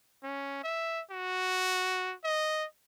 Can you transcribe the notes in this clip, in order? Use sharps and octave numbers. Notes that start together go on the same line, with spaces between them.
C#4
E5
F#4
D#5